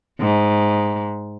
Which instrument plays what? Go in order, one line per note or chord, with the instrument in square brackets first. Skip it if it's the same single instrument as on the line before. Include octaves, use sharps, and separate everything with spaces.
[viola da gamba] G#2